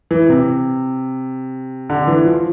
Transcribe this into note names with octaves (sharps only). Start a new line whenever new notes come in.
E3
C3
D3
E3
F3